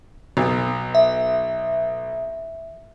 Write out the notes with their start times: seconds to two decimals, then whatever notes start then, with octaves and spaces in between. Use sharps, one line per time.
0.37 B1
0.95 E5